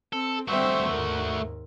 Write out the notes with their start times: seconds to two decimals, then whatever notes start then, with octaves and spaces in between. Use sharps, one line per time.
0.13 C4 A4
0.48 G3 A3 C4 F#4 C5 E5
0.90 D#2 G#2 A#4